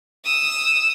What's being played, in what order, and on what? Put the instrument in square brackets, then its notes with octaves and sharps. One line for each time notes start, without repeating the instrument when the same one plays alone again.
[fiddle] D#6 E6